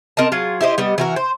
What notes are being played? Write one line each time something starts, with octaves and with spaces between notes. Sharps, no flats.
C4 A#4 D#5 A5
F#3 F4 G#4
E4 G4 C5 D#5
G3 B3 D#5
E3 F#4 A#4
C5